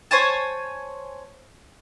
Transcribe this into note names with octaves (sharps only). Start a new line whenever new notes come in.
C5 C#5 G#5 A5